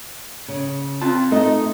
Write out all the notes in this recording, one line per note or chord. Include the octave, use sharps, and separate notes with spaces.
C#3
C4 F4 A5
A3 D#4 D#5